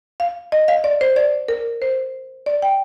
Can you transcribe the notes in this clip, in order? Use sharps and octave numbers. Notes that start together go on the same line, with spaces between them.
F5
D#5
F5
D5
C5
D5
A#4
C5
D5
G5